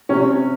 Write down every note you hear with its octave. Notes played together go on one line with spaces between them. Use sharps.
C3 C#4